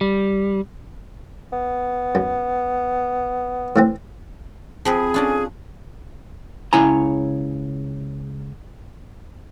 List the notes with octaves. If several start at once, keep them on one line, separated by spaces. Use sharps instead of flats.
G3
B3
F#2
A2 E3 C4
F3 C4 G#4 B4
C#4 D4 F4
C#2 C#3 E4 C#5 G#5 A#5